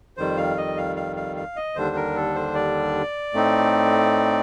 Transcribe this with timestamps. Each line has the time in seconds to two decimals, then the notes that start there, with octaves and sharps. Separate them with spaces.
0.17 F2 D#3 G3 C5
0.37 F5
0.57 D#5
0.77 F5
0.96 F5
1.16 F5
1.36 F5
1.56 D#5
1.76 D#2 D3 G3 D4 C5
1.96 A#4
2.16 A4
2.35 C5
2.55 D5
3.34 A2 A3 C4 D#4